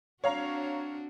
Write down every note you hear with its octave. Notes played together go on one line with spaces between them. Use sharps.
C4 D4 F#4 C#5 F5 A#5